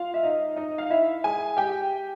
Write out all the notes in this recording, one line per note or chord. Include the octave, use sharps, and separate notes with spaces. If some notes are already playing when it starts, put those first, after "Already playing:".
Already playing: F4 F5
E5
D#4 D#5
D#4 D#5
F5
E4 E5
G#4 G#5
G4 G5